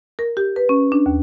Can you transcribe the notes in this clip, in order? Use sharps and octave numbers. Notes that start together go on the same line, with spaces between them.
A#4
G4
B4
C#4
D4
D#2